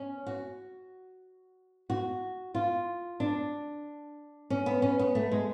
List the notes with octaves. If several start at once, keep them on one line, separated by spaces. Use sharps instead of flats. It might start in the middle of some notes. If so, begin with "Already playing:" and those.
Already playing: C#4
F#4
F#4
F4
D4
C#4
B3
C#4
B3
A3
G#3